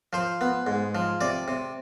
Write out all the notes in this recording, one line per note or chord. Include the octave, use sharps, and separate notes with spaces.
F3 C5
B3
G#2
F3
C3 D5
C3